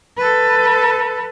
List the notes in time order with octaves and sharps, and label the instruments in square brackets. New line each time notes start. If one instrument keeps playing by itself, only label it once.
[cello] A4 B4